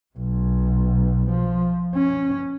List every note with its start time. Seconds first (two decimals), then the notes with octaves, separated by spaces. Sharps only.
0.17 B1
1.29 F3
1.95 C#4